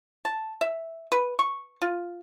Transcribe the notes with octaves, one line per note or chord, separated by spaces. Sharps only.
A5
E5
B4
C#6
F4